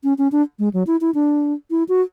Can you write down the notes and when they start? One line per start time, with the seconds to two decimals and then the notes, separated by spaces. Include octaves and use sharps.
0.04 C#4
0.18 C#4
0.32 D4
0.59 G#3
0.74 F#3
0.87 E4
1.01 E4
1.15 D4
1.71 E4
1.89 F#4